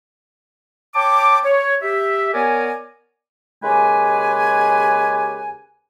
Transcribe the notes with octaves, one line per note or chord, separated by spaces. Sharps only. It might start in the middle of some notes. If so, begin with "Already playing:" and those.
C#5 G5 A5 D6
C#5
G4 E5
B3 A#4 C#5 D5 G#5
D#2 C#3 G#3 G4 B4 G#5